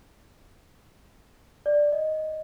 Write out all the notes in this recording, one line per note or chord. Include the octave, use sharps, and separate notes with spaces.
D5
D#5